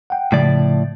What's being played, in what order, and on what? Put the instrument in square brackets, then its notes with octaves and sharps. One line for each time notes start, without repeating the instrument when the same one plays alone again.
[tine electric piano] F#5 G5
[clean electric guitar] A2 F3 D5 [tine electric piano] C#3